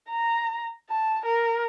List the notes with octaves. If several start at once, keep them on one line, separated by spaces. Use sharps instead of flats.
A#5
A5
A#4